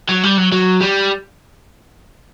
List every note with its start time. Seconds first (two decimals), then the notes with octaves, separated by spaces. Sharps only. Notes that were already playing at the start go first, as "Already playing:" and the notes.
0.09 F#3
0.23 G3
0.38 F#3
0.52 F#3
0.81 G3